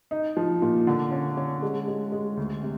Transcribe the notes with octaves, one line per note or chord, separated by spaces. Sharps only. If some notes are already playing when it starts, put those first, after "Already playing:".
D#4
F3
A#2
D3
C#4
C#4
G#3
G#3
G#3
D2
C3